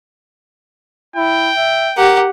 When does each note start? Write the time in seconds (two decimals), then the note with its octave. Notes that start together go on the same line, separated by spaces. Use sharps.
1.16 E4 G5
1.57 E5
1.97 G4 A#4 F#5